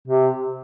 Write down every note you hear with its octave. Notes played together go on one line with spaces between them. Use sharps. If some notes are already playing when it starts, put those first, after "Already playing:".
C3